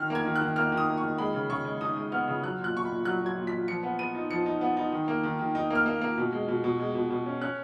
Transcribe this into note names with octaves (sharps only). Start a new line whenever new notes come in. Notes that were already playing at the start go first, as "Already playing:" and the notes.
Already playing: D#3 F6
A#3 G#6
D#3
F#6
D#3
A#3 F6
D#3
D#6
A#3
C#6
D#3
G#3 B5
C#3
C#3 C#6
G#3
D#4 D#6
G#3
B3 F6
C#3
F#3 F#6
A#2
F#6
A#2 C#6
A#2 B5
F#3 F#6
F#3
G#6
A#2
B6
A#2
F3 C#7
B3
B3 D#7
D#4
F3 C#7
D#4
B3
D#4
D#3
A#3
D#3
D#3
D#4
A#3 F6
A#3
A#3
B2
G#3
B2
B2
G#3
B2
B2
C#4
C#4 F#6